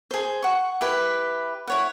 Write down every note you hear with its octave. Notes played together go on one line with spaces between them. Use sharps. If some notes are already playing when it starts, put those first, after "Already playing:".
G#4 C5
F#5 C#6
E4 G4 B4
E4 C#5 F#5